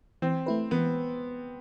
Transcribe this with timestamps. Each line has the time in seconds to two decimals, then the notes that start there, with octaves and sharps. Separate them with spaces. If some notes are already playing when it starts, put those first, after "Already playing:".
0.22 E3 C4
0.46 A3 E4 B4
0.71 E3 B3